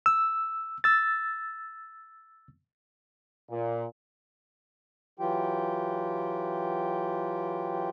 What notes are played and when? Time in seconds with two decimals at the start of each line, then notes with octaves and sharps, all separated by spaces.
0.06 E6
0.84 E6 A6
3.50 A#2
5.19 E3 F#3 F4 G4 G5